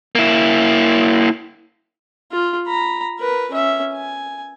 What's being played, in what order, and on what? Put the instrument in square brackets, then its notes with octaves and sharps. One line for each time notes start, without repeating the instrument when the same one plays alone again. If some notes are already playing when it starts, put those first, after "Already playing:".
[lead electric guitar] A#3 E4
[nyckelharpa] F4
A#5 B5
A#4 B4
C#4 E5
G#5